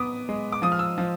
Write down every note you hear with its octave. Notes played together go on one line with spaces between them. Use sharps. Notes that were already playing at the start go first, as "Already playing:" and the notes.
Already playing: B3 D6 D#6
G#3
D6
F3 D#6
F6
E6
F3